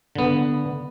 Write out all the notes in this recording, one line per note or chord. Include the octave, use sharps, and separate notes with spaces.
D3 B3